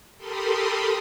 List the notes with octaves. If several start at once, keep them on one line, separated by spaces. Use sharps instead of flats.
G4 A4 A#4 B5 C6 D#6